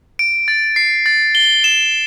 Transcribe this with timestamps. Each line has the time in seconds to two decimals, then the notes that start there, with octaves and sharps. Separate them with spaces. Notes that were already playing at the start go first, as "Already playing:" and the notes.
0.19 D7
0.48 A6
0.76 C7
1.06 A6
1.35 G7
1.64 E7